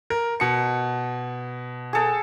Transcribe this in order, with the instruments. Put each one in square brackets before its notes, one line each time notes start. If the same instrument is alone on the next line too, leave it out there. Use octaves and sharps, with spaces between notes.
[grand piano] A#4
B2 C#7
[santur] G#4 A4 G5